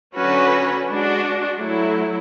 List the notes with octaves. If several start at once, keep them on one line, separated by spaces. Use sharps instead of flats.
D3 F#3 C#4 F#4 B4
G#3 D4 F#4
F#3 A3 E4